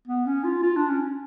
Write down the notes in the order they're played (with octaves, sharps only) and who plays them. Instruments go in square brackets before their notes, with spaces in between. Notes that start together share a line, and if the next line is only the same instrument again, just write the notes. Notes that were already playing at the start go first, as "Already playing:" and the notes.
[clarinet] B3
C#4
F4
F4
D4
C#4